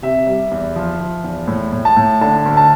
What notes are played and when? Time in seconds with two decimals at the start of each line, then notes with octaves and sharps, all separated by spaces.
0.02 C3 E5
0.27 G3
0.51 E2
0.76 F3
1.00 F3
1.24 E2
1.48 A2
1.72 A2
1.85 A5
1.96 A2
2.21 D3 A5
2.45 D2
2.57 A5